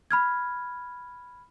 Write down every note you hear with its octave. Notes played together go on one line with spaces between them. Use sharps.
B5 F6 G#6